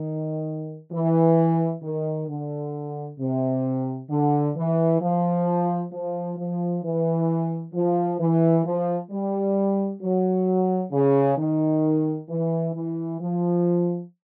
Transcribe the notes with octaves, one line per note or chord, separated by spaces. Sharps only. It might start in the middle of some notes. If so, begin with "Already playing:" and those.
Already playing: D#3
E3
D#3
D3
C3
D3
E3
F3
F3
F3
E3
F3
E3
F3
G3
F#3
C#3
D#3
E3
E3
F3